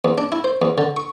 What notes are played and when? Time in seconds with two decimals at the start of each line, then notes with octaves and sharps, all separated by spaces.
0.05 E2
0.18 D4
0.32 E4
0.44 C5
0.62 E2
0.78 D3
0.97 C#6